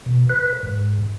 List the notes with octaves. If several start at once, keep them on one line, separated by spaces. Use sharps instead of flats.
B2
B4
G#2